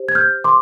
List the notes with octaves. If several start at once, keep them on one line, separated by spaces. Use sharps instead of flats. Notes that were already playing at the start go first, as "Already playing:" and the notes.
Already playing: G4 C5
G#6
F6 G6
C6 D6